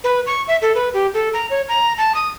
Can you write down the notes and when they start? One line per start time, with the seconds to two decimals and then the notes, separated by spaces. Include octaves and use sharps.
0.04 B4
0.27 C#6
0.48 E5
0.62 A4
0.75 B4
0.94 G4
1.14 A4
1.34 A#5
1.50 C#5
1.68 A#5
1.98 A5
2.15 D#6